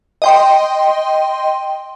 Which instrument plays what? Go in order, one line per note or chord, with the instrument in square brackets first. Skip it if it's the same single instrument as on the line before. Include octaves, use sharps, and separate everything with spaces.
[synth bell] D#5 G5 C6